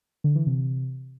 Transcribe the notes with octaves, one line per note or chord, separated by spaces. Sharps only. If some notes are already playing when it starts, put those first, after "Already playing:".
D3
E3
C3